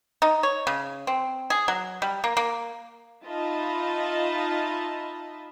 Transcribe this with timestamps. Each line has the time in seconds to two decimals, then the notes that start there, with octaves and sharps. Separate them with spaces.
0.22 D#4
0.43 C#5
0.67 C#3
1.07 C4
1.50 G#4
1.68 F#3
2.02 G3
2.24 A#3
2.37 A#3
3.24 D#4 F4 D#5 E5 A5 B5